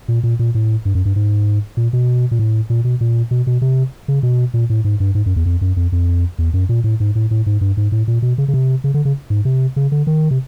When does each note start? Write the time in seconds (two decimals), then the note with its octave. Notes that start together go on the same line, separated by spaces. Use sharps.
0.08 A#2
0.23 A#2
0.39 A#2
0.55 A2
0.85 G2
0.95 F#2
1.05 G2
1.16 G#2
1.77 A#2
1.93 B2
2.31 A#2
2.39 A2
2.70 A#2
2.84 B2
3.01 A#2
3.31 B2
3.47 B2
3.62 C3
4.08 C#3
4.23 B2
4.54 A#2
4.70 A2
4.85 G#2
5.00 G2
5.15 G#2
5.26 F#2
5.36 E2
5.46 F2
5.61 F#2
5.76 F2
5.92 F2
6.39 E2
6.54 F#2
6.69 A#2
6.84 A2
7.00 G#2
7.15 A2
7.31 A2
7.46 G#2
7.61 G2
7.77 G#2
7.92 A2
8.08 A#2
8.22 B2
8.38 C#3
8.48 C#3
8.54 C3
8.84 C#3
8.94 D3
9.05 C#3
9.30 G#2
9.45 C3
9.76 C#3
9.92 D3
10.07 D#3
10.31 C3